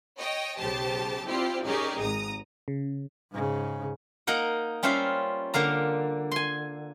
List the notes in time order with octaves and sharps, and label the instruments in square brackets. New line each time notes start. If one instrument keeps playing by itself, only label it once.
[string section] C#5 D#5 G5
B1 C#3 G4 C5 A5
C4 E4 F4 G4 C5 D5
C#4 D#4 G4 G#4 A#4 D5
G#1 A#5 D#6
[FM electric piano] C#3
[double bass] G#2 C#3
[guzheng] A#3 D#4 A#4 F#5
G3 C#4 F4 C5 E5 F5
D3 A#3 F5 A#5
G#5 C6